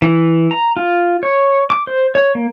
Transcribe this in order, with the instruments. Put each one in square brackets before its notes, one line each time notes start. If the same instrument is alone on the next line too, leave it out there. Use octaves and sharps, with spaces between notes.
[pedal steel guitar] E3
A#5
F4
C#5
D6
C5
C#5
A#3